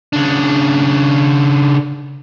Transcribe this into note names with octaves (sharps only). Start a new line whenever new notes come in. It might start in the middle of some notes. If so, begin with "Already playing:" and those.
C#3 D4